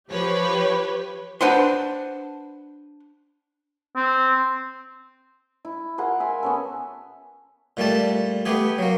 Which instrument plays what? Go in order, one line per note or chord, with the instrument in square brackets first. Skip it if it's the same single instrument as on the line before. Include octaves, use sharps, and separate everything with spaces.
[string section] F3 G4 B4 C#5
[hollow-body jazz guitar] D4 B4 C5 F#5 C6
[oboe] C4
[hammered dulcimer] E4
F4 G#4 A#4 F#5
E5 G#5
B3 C#4 A4
[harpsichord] A#2 G3 A3 A5
A3 B3 G4 G#4
F#3 A#3